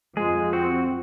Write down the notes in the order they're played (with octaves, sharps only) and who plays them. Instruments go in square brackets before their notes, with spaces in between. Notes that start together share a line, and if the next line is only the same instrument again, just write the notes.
[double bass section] F2 F3 [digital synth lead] G#3 [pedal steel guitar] G#4
[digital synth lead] C4 [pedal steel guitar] F#4